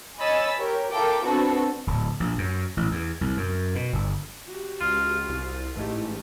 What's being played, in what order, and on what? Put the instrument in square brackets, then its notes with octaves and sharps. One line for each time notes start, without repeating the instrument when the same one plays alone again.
[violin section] C#5 D#5 G#5 B5 E6 A6
G4 A#4 C#5
F4 A4 A#4 E5 G5 D6
B3 C4 D4 F#4 A4 B4
[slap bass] D1
A#1
F#2
A1
E2
C2
F#2
B2
G1
[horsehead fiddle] F#4 G4
[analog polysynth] C#2 [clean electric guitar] F4
[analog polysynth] C2
[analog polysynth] A1 G#2 [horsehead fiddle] A3 G4